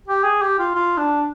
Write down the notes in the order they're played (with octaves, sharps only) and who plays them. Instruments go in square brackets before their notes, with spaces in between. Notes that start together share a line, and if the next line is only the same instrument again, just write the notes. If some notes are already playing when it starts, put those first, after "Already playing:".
[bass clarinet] G4
G#4
G4
F4
F4
D4